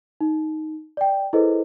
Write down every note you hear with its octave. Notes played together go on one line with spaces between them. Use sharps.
D#4
D5 G5
E4 G#4 A4 B4 C5 D#5